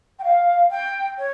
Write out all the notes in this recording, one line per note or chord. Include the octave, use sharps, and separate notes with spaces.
G5
F5
G5
C#5